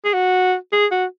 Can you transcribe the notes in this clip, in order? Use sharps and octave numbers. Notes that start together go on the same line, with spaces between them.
G#4
F#4
G#4
F#4